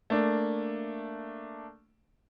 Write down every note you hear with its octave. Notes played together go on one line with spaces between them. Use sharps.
A3 A#3 D4